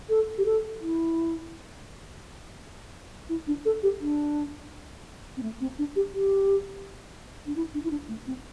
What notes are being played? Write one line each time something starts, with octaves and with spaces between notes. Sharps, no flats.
A4
G4
A4
E4
E4
D4
A4
G4
D4
C4
A3
C4
D4
G4
G4
D4
E4
D4
E4
D4
A3
C4